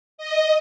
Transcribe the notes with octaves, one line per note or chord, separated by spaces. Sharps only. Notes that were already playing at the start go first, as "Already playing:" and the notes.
D#5